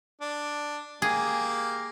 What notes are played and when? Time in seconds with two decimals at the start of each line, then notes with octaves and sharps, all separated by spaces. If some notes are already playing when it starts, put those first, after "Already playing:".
0.21 D4
1.02 A#3 G4 G#4